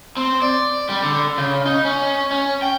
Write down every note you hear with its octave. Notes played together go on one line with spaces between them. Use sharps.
C4
D5
G3
D3
C#3
D#4
C#4
C#4
G5